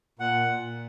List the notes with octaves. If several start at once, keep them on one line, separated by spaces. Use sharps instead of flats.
A#2 F#5
A#2